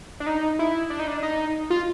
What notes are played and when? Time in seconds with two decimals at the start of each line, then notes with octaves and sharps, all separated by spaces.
0.20 D4
0.26 D#4
0.59 E4
0.90 D4
0.99 D#4
1.07 D4
1.23 D#4
1.70 F4